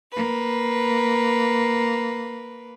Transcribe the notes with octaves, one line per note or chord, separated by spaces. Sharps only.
A#3 B4